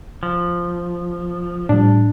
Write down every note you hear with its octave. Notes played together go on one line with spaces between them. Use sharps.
F3
A2 G3 D4